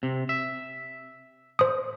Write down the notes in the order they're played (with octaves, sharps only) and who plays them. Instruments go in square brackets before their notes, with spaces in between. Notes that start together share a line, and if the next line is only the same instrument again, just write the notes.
[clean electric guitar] C3
E5
[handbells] C5 D#6